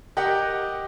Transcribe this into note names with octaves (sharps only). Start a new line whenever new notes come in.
G4 A#4 D#5 F#5 G5